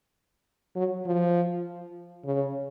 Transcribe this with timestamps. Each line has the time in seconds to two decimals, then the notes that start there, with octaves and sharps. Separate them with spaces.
0.76 F#3
1.06 F3
2.25 C#3